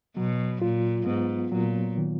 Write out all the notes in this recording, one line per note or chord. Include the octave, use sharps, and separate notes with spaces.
B2 F#3
A#2 F4
G#2 B3
A#2 F#3
D#3